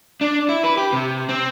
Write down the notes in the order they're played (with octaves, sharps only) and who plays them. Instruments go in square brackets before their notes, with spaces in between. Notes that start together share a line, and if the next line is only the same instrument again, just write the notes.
[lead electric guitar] D4
E4
B4
G4
C3
C4